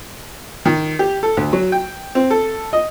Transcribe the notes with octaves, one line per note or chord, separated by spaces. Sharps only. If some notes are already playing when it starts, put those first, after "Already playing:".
D#3
G4
A4
D2
F#3
G5
C4
A4
D#5